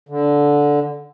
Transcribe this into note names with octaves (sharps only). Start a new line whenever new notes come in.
D3